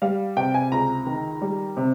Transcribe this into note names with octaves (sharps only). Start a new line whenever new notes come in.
G3 F5
C3 G5
G#5
C#2 A#5
D#3
G3
C3